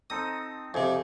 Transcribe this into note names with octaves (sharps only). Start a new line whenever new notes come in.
C4 D#4 A4 D#6
F2 C3 G#4